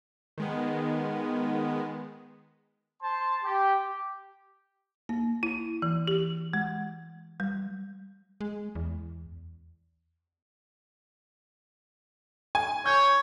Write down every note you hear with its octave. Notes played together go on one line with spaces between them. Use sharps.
D#3 G#3 B3
C5 A5 C6
G4
A#3
E4
E3
G4
G#3
G3
G#3
E2
G#5
C#5 G6